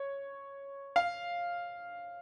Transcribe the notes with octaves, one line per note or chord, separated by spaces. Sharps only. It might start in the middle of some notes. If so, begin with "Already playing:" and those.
Already playing: C#5
F5